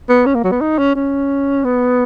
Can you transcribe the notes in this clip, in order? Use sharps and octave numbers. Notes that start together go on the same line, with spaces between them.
B3
C#4
A#3
F#3
B3
D#4
C#4
C#4
B3